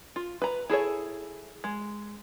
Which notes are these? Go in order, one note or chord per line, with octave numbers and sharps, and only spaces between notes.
F4
B4 A#5
E4 G#4 A4 C#5
G#3